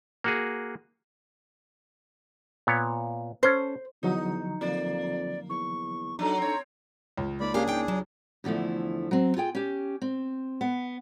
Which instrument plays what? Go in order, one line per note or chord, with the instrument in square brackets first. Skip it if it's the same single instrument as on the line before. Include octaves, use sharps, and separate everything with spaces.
[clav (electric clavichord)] A#3 F#4 G#4
A#2 B3 C#5
[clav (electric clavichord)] C#4 A4 [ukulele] C5
[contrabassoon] E2 [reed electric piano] D3 F3 F#3 [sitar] D#4
[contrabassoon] F2 [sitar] A#3 [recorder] D5
[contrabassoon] E2 [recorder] C#6
[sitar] F#3 [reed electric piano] D4 D#4 A4 [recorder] A#5
[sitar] C4 C#5
[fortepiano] C#2
[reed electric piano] G#3 A#3 D#4 [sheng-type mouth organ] D5 B5
[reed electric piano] A#3 C#4 [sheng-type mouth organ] D4 G#4 [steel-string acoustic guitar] G4 F5
[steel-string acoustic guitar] D#4 G5
F#3
E2 D3 F3 A3 E4
F#3 C4
F4 G#4 G5
C#4 G4
C4
B3